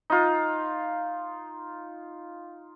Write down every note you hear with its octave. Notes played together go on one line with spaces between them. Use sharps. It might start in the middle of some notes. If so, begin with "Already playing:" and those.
D#4 F4